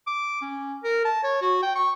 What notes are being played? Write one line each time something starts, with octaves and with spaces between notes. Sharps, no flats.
D6
C#4
A#4
A5
C#5
F#4
G5
C#6